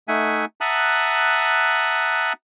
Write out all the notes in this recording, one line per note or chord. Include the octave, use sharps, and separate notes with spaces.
A3 D#4 E5 F#5 G#5
E5 F#5 A5 A#5 D#6 F#6